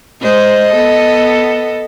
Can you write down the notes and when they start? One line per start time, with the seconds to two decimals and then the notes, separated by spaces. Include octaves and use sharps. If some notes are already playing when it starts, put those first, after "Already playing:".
0.21 G#3 C5 D#5
0.72 B3 A4